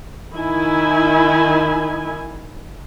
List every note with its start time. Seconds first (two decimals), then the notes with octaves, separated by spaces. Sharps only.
0.34 D#3 E4 G#5